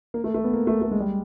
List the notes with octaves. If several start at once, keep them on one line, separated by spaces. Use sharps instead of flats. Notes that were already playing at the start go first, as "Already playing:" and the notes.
A#3
A3
A3
B3
A#3
A3
A3
G#3
G3